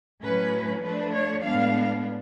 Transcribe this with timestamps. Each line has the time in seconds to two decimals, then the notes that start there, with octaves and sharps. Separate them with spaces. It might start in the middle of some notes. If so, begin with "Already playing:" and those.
0.23 A2 F#3 C#4 B4
0.83 F3 A3 D4 B4
1.13 C#5
1.43 A2 G#3 B3 D4 F5